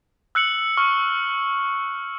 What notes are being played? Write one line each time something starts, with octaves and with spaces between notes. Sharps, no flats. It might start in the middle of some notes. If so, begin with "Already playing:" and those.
E6 F#6 C#7 F#7
C#6 F6